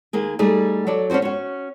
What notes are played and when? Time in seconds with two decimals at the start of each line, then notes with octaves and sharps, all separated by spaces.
0.13 D#2 A#3 G#4
0.39 G3 A3 D#4 G#4
0.87 F#3 A4 D5
1.10 C#4 D4 E4 F#4 C5
1.22 C#4 F#4